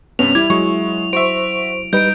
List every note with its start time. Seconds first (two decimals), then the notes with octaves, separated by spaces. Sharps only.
0.19 G2 C3 B3 C#4 F7
0.35 G3 E4 D6 G#6
0.50 F#3 G#3 C#6
1.13 F#4 C5 E5 C#6 D7
1.93 G3 D#4 B4 G6 D7